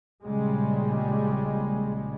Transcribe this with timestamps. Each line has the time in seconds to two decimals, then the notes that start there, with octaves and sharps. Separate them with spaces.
0.23 A#1 C#3 G3 G#3